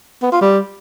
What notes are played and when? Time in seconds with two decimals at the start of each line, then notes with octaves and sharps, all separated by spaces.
0.22 B3
0.32 F4
0.41 G3